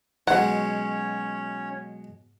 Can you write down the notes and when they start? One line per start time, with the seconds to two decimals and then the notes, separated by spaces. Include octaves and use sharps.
0.27 B2 F#3 G#3 C#4 C#5 F#5